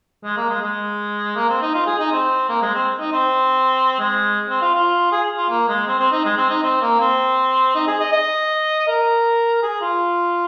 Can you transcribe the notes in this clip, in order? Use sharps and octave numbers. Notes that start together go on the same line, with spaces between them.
G#3
A#3
G#3
G#3
A#3
C4
D#4
F4
G#4
D#4
C4
A#3
G#3
C4
D#4
C4
G#3
C4
F4
F4
G#4
F4
A#3
G#3
C4
C4
D#4
G#3
C4
D#4
C4
A#3
C4
D#4
G#4
D#5
D#5
A#4
G#4
F4